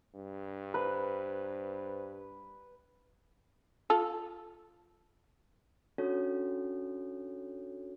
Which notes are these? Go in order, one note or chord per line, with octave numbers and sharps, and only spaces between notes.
G2
B4 C5
F4 A4
C#4 D4 F#4 A4 C#5